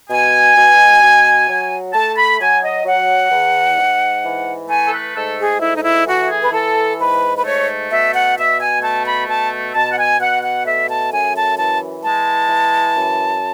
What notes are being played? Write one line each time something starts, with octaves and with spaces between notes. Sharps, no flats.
B2 G#5
B2
B2
F#3
A3 A5
B5
F#3 G#5
D#5
F#3 F#5
E2
G#2
E3
A3 G#5
A4
B4
G#2 A4
G#4
A3 E4
D#4
E4
E3 F#4
G#4
B4
E3 A4
G#2 B4
B4
A3 C#5
B2 E5
F#5
B2 E5
G#5
A3 A5
B5
B2 A5
B2 A5
F#5
G#5
B2 F#5
F#5
A3 E5
A5
F#2 G#5
A5
E3 A5
G#3 A5
E3
F#2